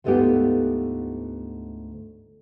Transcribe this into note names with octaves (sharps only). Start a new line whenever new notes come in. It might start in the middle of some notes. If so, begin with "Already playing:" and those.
D2 G#2 A3 B3 F4 G4